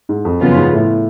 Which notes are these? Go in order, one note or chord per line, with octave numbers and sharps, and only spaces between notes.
G#2
F2
F#2 C#3 F3 B3 F4
G#2
A2